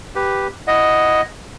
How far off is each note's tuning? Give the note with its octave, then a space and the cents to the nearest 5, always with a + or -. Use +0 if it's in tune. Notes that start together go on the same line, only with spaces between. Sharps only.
G4 +0 B4 +0
E4 +0 D#5 +0 F#5 +0